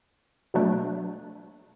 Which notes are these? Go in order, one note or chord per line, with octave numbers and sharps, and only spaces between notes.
B2 F#3 A3 D4